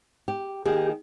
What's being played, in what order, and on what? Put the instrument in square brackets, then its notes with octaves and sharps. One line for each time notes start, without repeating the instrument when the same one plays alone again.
[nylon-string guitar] G4
[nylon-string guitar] D#3 A#3 G#4 [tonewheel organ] G4